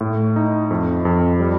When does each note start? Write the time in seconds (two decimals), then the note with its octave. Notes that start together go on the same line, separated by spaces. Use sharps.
0.01 A2
0.36 D#4
0.71 F2
1.05 F2
1.40 G3